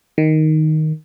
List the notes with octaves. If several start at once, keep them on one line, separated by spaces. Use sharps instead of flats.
D#3